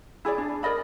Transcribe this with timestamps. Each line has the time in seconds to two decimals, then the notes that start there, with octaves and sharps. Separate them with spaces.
0.25 E4 G#4 A4 D5
0.38 D4
0.63 A#4 D5 D#5 B5